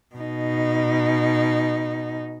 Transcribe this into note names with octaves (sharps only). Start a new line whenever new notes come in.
B2 D#4